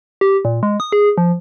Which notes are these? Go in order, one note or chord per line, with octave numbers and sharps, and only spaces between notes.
G4
A#2
G#3
D#6
G#4
F3